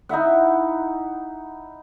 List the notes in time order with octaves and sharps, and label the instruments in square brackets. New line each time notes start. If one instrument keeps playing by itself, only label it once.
[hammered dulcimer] D#4 E4 E5 F#5